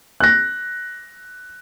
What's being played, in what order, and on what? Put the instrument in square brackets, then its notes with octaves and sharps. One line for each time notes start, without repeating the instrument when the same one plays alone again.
[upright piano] F#6 A#6